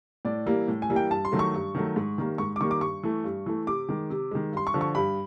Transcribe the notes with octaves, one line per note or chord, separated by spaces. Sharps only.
A2 D5
E3 G3 A#3
A2
G#5
E3 G3 A#3
G5
G2 A5
C6
D#3 F#3 A3
C#6
G2
D#3 F#3 A3
G#2
D#3 G3 A#3
G#2 C#6
D6
D#3 G3 A#3 C#6
D6
G2 C#6
E3 A3
G2
E3 A3
C3 D6
D#3 G#3
C3
D#3 G#3
G2 C6
C#6
D3 F3
C#6
G2 B5